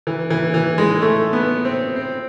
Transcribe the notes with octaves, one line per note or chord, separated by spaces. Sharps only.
E3
E3
E3
G#3
A3
B3
C4
C4